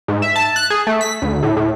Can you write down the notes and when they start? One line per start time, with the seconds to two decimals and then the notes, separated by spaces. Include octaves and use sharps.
0.08 G#2
0.22 E5
0.36 A5
0.56 F#6
0.70 G#4
0.87 A3
1.01 B6
1.22 D2
1.43 A2
1.57 A2